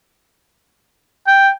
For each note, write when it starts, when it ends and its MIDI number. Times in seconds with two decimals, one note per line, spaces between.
1.27 1.50 79